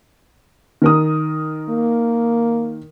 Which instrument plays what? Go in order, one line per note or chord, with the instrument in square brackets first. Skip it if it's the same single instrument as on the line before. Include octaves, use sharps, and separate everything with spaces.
[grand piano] D#3 A#4 D#6
[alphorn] A#3